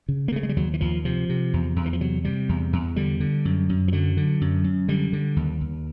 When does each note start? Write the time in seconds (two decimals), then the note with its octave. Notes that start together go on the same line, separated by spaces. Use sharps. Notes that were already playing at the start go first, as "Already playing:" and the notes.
0.08 C#3
0.28 A#3
0.32 C#3 A3
0.43 G#3
0.49 G3
0.56 D#2 F#3
0.73 E3
0.81 D#2 F3
1.05 C3 F3
1.29 C3
1.53 E2
1.76 E2
1.86 E3
1.93 F3
2.01 C3 F#3
2.24 C3 G3
2.49 E2
2.73 E2
2.96 D3 G3
3.20 D3
3.45 F#2
3.69 F#2
3.88 F3
3.93 D3 F#3
4.17 D3
4.41 F#2
4.64 F#2
4.88 D3 G3
5.13 D3
5.36 D#2
5.61 D#2